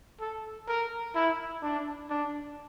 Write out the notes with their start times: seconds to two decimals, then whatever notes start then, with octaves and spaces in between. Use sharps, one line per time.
0.20 A4
0.68 A#4
1.15 E4
1.63 D4
2.10 D4